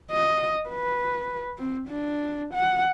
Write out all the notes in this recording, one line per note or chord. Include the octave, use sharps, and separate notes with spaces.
D#5
B4
C4
D4
F#5